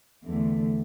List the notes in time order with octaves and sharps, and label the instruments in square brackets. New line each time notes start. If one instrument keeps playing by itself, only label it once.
[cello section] E2 D3 A3